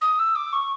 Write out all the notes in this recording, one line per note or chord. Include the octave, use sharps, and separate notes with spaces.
D#6
E6
D6
C#6